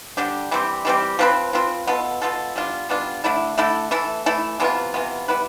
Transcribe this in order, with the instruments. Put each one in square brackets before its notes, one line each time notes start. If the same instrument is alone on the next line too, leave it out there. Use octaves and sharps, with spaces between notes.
[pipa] D3 G3 D4 G4
E3 G3 C4 G4
E3 G3 C4 G4
F3 C4 F4 B4
F3 C4 F4 B4
B2 B3 F4 A4
B2 B3 F4 A4
G3 B3 D4 F4
G3 B3 D4 F4
D3 A3 E4 A4
D3 A3 E4 A4
E3 A3 E4 A4
E3 A3 E4 A4
C3 E3 B3 F4
C3 E3 B3 F4
G3 B3 E4 B4